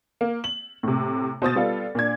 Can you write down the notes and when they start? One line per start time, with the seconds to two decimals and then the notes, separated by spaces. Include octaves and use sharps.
0.21 A#3
0.44 F#7
0.83 A2 C3
1.42 B2 C5 D#6 A6
1.55 G3 B3 F4 A4
1.95 A#2 D4 G#6